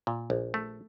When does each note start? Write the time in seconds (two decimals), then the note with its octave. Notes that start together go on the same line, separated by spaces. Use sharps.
0.07 A#2
0.30 A#1
0.54 A3